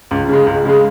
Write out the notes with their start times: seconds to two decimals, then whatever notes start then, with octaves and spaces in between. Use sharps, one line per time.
0.11 C#2
0.28 C#3 G#3
0.47 C#2
0.65 C#3 G#3